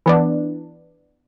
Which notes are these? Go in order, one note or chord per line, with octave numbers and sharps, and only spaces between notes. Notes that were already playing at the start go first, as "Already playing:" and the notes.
E3 B3 D4